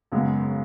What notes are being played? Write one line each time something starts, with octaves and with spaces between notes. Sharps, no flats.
G#1 F#2 C#3 G#3 B3